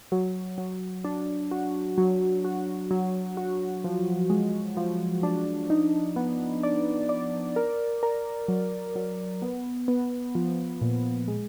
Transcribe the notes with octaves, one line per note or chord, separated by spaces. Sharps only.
F#3
F#3
D4
F#4
F#3
F#4
F#3
F#4
F3
G#3
F3
D4
D#4
B3
D5
D5
A#4
A#4
F#3
F#3
B3
B3
F3
A#2
G#3